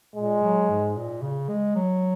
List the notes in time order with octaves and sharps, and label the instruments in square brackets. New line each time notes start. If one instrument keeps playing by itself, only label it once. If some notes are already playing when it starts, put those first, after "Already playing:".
[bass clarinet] A#2 [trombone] G#3
[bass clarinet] F#3
G#2
A#2
C#3
G#3
F#3